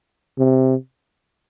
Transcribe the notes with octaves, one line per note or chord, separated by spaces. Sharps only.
C3